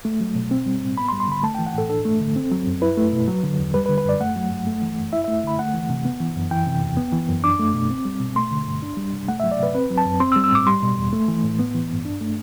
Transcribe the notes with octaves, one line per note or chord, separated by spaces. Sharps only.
A3
F#3
B2
C4
G3
A2
B3 B5
C6
G3
C6
D3 B5
A3 A5
G5
E3
F#5
A2 A4
D4 A4
A3
D3
C4
F#3
F#2
E4 B4
A3
B2
F#3
D3
E2
G3 B4
B4
D3
B4
F#2 D5
A3 F#5
F#3
G2
A3
E3
F#2
E4 E5
E5
A3
D3 B5
A3 F#5
E3
C3
B3
E3
F#2
E3 G5
C3
E2
B3
E3
F#2
D4 D6
A3
B2
C4
G3
B2
A3 C6
D3
G2
D4
G3
C3
A3 F#5
E5
F#3
D5
C3 B4
C4 B4
F#3
A5
F#2
C4 C6
E6
G3
E6
A2 D6
G3 C6
B2
E2
A3
E3
A2
B3
E3
G2
D4
A3